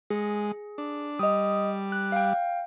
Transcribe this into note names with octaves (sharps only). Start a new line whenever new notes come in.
G#3 G#4
D4
G3 D#5 D#6
F#6
F5 G5